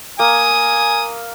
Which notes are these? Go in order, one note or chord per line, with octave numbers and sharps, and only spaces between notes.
A#3 G#5 D#6